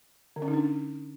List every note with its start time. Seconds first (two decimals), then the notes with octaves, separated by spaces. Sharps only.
0.36 D3
0.42 C#4
0.48 D#4
0.54 D4